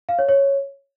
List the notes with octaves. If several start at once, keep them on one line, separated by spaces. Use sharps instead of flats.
F5
C#5
C#5